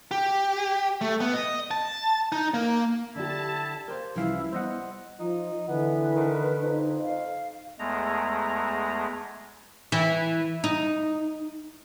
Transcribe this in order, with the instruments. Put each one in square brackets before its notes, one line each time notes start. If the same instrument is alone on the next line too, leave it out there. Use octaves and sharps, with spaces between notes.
[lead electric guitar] G4
A3
B3
D#5
A5
D#4
A#3
[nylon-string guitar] D3 D4 G4 [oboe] E4 [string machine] A5
[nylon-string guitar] G4 F5 [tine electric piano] A#4 C5
[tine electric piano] C2 F5 [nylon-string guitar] E3 F3 C#4 [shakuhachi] E4
[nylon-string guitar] G3 B3 [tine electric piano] C5 D#5 F#5
[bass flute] F3 [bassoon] D#4 [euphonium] F4
[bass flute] D3 [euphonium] E3 [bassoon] B3 [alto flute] B4
[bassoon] D#3
[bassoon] F2 [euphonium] D#4
[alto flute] F5
[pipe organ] E2 G#3 A3 A#5
[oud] E3
D#4